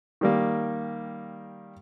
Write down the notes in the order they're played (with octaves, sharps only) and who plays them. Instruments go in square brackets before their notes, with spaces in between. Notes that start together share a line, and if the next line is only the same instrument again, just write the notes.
[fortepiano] D#3 G3 A#3